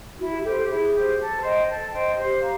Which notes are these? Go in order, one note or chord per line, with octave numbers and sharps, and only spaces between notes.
E4 F#4
G4
G4 A4 C5
A4
E4 G#4
G4 C5
A4
C5 D#5 G5
A4
C5 D#5 G5
G4 C5
F5 A#5